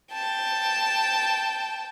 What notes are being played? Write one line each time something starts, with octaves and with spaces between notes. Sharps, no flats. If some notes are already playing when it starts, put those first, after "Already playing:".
G5 A5